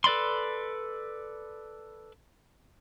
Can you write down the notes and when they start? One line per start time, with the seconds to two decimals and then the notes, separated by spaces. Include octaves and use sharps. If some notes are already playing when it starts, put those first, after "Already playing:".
0.04 A4 B4 D5 B5 C6